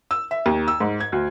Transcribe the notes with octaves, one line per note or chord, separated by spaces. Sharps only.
E6
E5
D#2
E6
G#2
G#6
D2